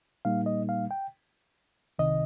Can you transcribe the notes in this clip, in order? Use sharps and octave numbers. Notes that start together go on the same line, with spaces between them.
A#2 G3 A#3 D#4 F5
D#5
F5
G5
C2 C3 D#3 D#5